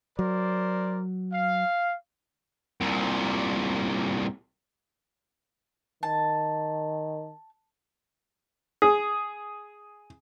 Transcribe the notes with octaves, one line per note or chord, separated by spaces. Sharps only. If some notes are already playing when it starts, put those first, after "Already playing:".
F#3 A#4 C5 D5
F5
C2 A#2
D#3 A5
G#4